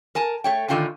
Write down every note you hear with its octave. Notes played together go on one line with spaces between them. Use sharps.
A#4 G#5 A5
A3 C#5 G5
A2 D3 D#3 F4 G5 G#5